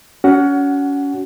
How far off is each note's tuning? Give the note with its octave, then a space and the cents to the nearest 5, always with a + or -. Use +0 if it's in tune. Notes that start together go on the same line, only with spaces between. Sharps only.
C#4 +25 F#4 +20 F#5 +0